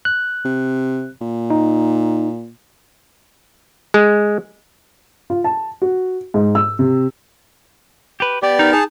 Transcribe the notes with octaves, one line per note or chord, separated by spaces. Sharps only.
F#6
C3
A#2
D#4
G#3
F4
A5
F#4
G#2
E6
C3
G4 B4
B3 G4 D5
D#4 A#4
G#4 A5